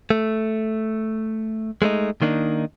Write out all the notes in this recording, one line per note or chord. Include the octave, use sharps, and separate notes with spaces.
A3
G#3 A3 C#4 D#4
D#3 A#3 D4 D#4